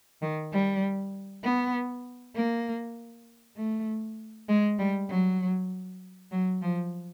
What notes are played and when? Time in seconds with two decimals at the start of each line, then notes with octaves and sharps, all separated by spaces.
0.22 D#3
0.52 G3
1.44 B3
2.35 A#3
3.57 A3
4.49 G#3
4.79 G3
5.09 F#3
6.32 F#3
6.62 F3